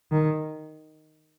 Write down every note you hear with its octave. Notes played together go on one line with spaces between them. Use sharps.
D#3